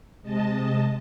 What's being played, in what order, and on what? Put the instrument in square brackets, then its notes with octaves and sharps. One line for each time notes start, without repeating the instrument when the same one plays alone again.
[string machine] C3 G#3 D#5 A5